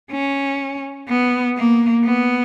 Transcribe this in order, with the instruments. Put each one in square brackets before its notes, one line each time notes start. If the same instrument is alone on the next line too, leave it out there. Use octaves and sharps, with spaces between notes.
[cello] C#4
B3
A#3
B3